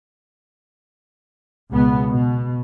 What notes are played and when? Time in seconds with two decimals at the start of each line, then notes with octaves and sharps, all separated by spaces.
1.72 C#2 B2 G#3 B3
2.10 B2